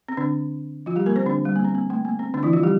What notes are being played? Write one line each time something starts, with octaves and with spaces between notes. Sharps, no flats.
C4
D3 D4
F3 F4
G3 G4
A#3 A#4
C4 C5
D3 D4
G3
A#3
C4
A#3
A3
A#3
C4
D3 D4
E3 E4
F3 F4
G3 G4